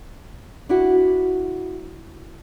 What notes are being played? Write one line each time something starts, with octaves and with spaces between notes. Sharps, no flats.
D4 E4 F#4